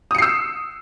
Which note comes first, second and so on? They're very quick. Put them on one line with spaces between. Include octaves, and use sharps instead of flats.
D#6 C#7 C7 E6